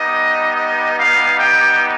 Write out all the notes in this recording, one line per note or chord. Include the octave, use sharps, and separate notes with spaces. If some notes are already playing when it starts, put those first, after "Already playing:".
Already playing: G3 B3 D#4 G4 D#5
D#5
F5
G5